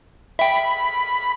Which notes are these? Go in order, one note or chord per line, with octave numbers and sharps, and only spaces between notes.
E5 G5 B5